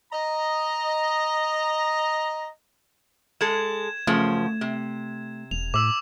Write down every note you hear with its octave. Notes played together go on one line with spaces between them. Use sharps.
D#5 A#5
G#3 A4 G#6 E7
F#2 C#3 F3 A3
C3
E1 F7
A2 D6 E6